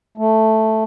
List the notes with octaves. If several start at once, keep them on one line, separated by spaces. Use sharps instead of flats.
A3